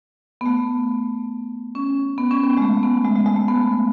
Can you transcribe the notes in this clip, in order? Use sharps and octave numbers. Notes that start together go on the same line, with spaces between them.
B3
A3
C#4
B3
C#4
B3
G#3
A3
B3
G#3
G#3
G#3
A3
B3